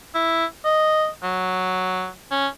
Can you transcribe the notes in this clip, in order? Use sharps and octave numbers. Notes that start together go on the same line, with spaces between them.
E4
D#5
F#3
C#4